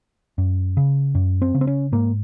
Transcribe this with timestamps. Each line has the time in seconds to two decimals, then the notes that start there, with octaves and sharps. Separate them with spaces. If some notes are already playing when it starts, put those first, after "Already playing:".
0.38 F#2
0.77 C#3
1.15 F#2
1.42 C4
1.54 C#3
1.61 C4
1.67 C#4
1.92 G#2 A#3